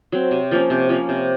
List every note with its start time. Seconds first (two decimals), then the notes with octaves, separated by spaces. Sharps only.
0.12 F#3 C4
0.31 C3
0.51 F3 A#3 C#4
0.70 C3
0.89 F3 A#3 C#4
1.09 C3